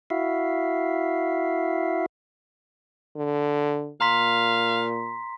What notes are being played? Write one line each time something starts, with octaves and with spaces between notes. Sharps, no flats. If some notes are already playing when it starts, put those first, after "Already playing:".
E4 F#4 E5 F5
D3
A#2 F5 A#5 C6 B6